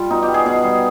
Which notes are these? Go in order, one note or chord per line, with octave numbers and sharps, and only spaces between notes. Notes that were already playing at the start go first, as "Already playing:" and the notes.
Already playing: G3 F4
B2 D#4
G4
G3
G#4
B2 G#4
G3